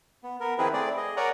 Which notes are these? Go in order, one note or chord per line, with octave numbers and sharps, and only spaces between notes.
B3
B3 A#4
D#3 F3 C4 E4 G#4 B4
A3 C4 G#4 D5
G#4 D#5
A#4 C#5 D5 F#5 G#5 A#5